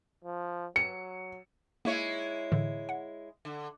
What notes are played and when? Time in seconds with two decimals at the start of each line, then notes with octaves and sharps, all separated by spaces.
0.24 F3
0.76 F#3 C#7
1.85 G#3 A#3 E4 C#5
2.52 A2 D3 E3
2.89 F#5
3.45 D3